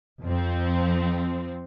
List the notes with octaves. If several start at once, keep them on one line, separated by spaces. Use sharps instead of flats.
F2 F3 C4